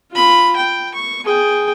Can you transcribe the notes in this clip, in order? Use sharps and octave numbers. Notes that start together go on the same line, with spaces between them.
F4 B5
G5
C#6
G#4 G5